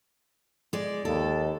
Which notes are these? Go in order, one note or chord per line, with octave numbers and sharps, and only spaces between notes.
G#3 D5
D#2 A4